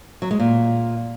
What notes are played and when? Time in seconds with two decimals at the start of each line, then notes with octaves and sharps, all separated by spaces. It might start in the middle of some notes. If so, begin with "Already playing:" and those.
0.22 F#3
0.31 G#3
0.39 A#2